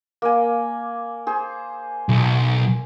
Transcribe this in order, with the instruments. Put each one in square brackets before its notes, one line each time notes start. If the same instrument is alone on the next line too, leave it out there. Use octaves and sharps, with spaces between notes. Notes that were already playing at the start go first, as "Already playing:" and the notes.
[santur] A#3 G#5
G#4 C5
[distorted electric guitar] B1